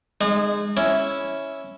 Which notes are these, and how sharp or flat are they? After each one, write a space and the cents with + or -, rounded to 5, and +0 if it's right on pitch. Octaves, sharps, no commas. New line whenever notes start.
G#3 -10 D#4 -35
C#4 +0 E4 -5